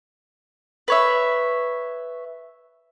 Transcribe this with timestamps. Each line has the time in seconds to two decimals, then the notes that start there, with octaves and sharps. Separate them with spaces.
0.88 B4 C#5 E5